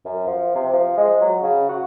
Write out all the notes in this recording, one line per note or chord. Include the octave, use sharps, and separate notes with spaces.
F#2
F3
C3
F3
G#3
F#3
C#3
F#4